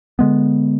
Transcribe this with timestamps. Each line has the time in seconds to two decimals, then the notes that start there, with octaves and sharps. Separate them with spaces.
0.19 D3 G#3 B3